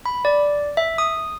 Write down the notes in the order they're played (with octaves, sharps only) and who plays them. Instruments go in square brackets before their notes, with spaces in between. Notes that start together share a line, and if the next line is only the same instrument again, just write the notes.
[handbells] B5
D5
E5
D#6